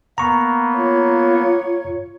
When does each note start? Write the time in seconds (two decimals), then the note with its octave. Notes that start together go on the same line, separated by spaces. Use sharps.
0.18 A#3 B3 A#5 C#6
0.75 F4 C#5